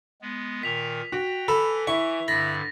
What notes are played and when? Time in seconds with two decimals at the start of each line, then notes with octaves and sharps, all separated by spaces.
0.22 G#3 B3
0.63 A#2 D#3 A#4 B6 F7
1.12 F#4 G5
1.48 E3 A4 B5
1.87 E4 C#6
2.28 G2 D3 B5 A6 A#6